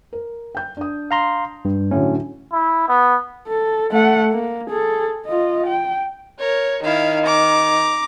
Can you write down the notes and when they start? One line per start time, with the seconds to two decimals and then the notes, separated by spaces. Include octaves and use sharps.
0.13 A#4
0.55 G5 G6
0.77 D4 D#6
1.11 F5 A#5 C6
1.65 G2
1.91 A2 D3 F#3 C#4
2.52 E4
2.88 B3
3.48 A4
3.92 A3 F#5
4.32 A#3
4.70 G#4 A4
5.26 F4 D#5
5.67 G5
6.39 A#4 C#5
6.83 D#3 E4 F5
7.25 A#5 D6